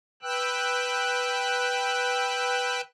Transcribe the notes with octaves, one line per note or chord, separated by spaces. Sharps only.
B4 G5 E6 F#6